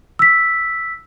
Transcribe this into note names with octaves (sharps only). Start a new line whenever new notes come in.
E6 B6